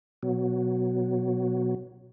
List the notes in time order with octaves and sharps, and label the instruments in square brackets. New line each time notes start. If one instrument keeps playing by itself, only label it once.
[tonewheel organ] B2 F#3